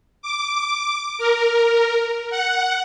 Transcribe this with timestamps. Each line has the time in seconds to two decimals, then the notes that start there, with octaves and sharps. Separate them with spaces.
0.22 D6
1.18 A#4
2.30 F#5